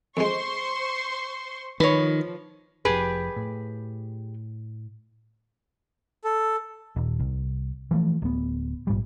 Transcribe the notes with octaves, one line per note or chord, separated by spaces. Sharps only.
F2 G#3 C5 C6 C#6
D#3 F3 B4 C#5
F1 F2 G4 G#4 B4
A2
A4
D#1
C2
E3 F3 A3
D1 B3
A#1 G#2 G3